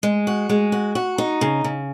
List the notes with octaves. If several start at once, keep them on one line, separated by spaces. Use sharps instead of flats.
G#3
F#4
G#3
F#4
F#4
D#4
C#3
C#3